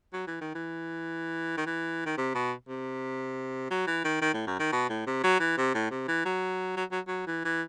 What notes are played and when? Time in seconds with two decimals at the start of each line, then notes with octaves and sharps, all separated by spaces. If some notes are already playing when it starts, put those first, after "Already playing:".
0.13 F#3
0.27 E3
0.41 D#3
0.55 E3
1.57 D#3
1.66 E3
2.06 D#3
2.18 C3
2.35 B2
2.68 C3
3.71 F#3
3.87 E3
4.05 D#3
4.21 D#3
4.34 A2
4.47 F#2
4.59 D#3
4.72 B2
4.89 A2
5.07 C3
5.24 F#3
5.40 E3
5.58 C3
5.75 A2
5.91 C3
6.08 E3
6.25 F#3
6.76 F#3
6.92 F#3
7.08 F#3
7.27 E3
7.45 E3